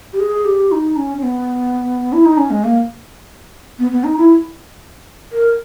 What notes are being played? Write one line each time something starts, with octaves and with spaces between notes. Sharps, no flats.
G4
G#4
G4
D#4
C#4
C#4
B3
E4
D#4
C#4
G#3
A#3
B3
B3
D#4
E4
A#4